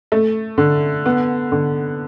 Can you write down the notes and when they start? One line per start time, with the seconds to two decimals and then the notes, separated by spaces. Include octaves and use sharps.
0.12 A3
0.58 D3
1.06 B3
1.52 D3